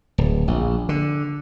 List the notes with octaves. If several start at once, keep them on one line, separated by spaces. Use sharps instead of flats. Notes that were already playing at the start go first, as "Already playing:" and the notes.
D1
A#1
D3